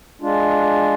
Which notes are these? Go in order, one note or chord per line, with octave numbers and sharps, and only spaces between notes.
G#3 D4 F4